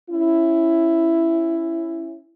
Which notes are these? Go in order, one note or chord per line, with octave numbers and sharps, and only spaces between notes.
C#4 E4